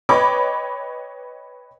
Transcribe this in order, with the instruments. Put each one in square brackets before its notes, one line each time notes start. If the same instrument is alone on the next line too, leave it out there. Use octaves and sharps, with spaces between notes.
[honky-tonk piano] B4 C#5 D#5 G5 B5 D6